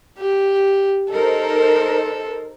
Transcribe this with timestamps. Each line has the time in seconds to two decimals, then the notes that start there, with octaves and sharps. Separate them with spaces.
0.18 G4
1.11 D#4 A4 A#4 C5